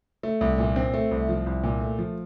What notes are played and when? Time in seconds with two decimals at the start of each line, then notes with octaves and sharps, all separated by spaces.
0.23 A3
0.41 C2
0.58 A#2
0.76 C4
0.94 A3
1.11 C2
1.29 F3
1.46 C2
1.63 A#2
1.81 A3
1.99 F3